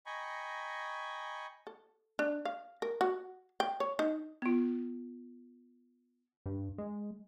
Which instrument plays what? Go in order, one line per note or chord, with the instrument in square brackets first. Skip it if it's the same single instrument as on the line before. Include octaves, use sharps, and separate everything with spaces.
[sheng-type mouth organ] D#5 G5 G#5 A#5 B5 C#6
[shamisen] A4
D4
F5
A#4
F#4
G5
C#5
D#4
[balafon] B3 F4
[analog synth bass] G2
G#3